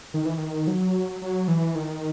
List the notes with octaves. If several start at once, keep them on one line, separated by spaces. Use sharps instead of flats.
D#3
E3
D#3
F#3
F#3
E3
D#3